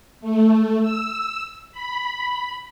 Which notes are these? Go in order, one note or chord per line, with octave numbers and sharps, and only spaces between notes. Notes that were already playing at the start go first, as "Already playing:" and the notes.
A3
E6
B5